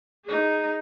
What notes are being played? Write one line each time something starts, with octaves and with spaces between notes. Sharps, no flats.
D#4 G#4